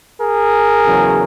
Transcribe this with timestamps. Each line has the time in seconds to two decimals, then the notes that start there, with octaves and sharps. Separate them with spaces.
0.20 G#4 A#4
0.86 E2 C#3 F#3